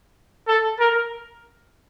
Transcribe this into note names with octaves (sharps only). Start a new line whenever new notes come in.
A4
A#4